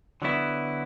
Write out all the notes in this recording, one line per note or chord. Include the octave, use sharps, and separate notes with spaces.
D3 F#3 B3 E4